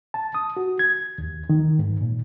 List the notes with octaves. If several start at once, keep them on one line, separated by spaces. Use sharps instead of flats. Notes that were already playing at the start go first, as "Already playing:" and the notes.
A5
D#6
F#4
G#6
D#2
D#3
G#2
A#2